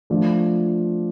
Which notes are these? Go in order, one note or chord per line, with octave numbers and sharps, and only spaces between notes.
F3 A3 D4 F4